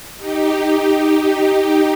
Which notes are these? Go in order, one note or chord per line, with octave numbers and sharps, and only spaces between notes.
D#4 G4